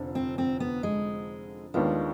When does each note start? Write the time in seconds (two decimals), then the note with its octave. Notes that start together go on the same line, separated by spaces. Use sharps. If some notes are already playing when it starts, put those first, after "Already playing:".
Already playing: F1 D3 F3
0.15 C4
0.38 C4
0.60 B3
0.83 G#3
1.74 D#2 D#3 G#3 B3 D4 F4